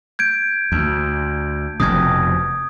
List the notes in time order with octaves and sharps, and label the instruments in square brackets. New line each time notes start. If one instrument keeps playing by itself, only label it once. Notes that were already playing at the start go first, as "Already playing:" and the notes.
[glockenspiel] G6 G#6 D7
[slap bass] D2
[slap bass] F1 F2 B2 [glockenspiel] D#6 G#6